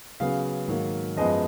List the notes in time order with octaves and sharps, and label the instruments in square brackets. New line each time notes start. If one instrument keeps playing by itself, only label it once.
[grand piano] C#3 F#3 B3 F5
G#2 D#3 F#3 A#3
F#2 F3 G#3 B3 D#5